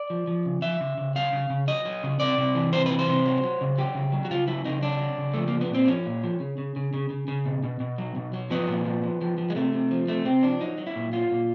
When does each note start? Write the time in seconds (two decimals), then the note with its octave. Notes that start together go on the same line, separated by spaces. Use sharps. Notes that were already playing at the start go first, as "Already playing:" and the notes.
Already playing: D5
0.10 F3
0.27 F3
0.46 C#3
0.62 F3 E5
0.80 C#3
0.97 C#3
1.16 F#3 F5
1.33 C#3
1.50 C#3
1.68 F#3 D#5
1.85 F#3
2.03 C#3
2.20 C3 D5
2.38 C3
2.55 E3
2.73 C3 C5
2.86 E3 B4
2.99 C5
3.08 C3
3.25 F#3
3.43 F#3
3.61 C#3
3.78 F#3 G4
3.95 C#3
4.12 F#3
4.25 F#4
4.30 C#3 F4
4.47 F#3 E4
4.65 C#3 D#4
4.82 F#3 D4
5.00 F#3
5.18 C#3
5.34 F3 A3
5.48 F3 A#3
5.61 B3
5.70 A#2 C4
5.87 F3 C#4
6.06 A#2
6.24 F3
6.40 C#3
6.58 C#3
6.76 C#3
6.94 C#3
7.10 C#3
7.28 C#3
7.46 B2
7.63 B2
7.80 B2
7.98 F#3
8.16 B2
8.34 F#3
8.50 F3 B3
8.68 A#2
8.85 F3
9.03 F3
9.21 F3
9.38 F3
9.50 G#3
9.56 C3 A3
9.73 C3
9.91 F3
10.08 C3 A3
10.25 C3 C4
10.43 F3 D4
10.61 F#3 D#4
10.78 F#3
10.87 E4
10.96 A#2
11.13 F#3 F4
11.31 A#2